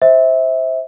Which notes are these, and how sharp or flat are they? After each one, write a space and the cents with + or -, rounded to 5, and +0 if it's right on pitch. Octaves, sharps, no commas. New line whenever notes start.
C5 +5 E5 -20